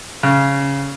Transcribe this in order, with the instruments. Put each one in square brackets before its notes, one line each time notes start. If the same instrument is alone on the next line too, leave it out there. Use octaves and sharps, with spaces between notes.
[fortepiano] C#3